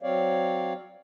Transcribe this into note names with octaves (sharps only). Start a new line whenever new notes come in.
F#3 C4 C#5 D5 F5